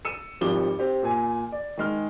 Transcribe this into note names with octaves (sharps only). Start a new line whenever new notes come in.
E6 C#7 D#7 E7
G#1 F3 G3 D6 G7
C4 G4
A#2 G#5
D5
D#3 G#3 F6